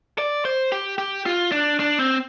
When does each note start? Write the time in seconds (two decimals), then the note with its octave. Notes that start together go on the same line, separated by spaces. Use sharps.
0.18 D5
0.45 C5
0.72 G4
0.98 G4
1.26 F4
1.52 D4
1.80 D4
1.99 C4